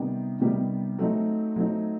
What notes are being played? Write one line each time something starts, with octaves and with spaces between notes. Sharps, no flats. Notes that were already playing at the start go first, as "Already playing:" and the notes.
Already playing: C3 D#3 G3 B3
C3 D#3 G3 B3
F#3 A3 C4 D#4
F#3 A3 C4 D#4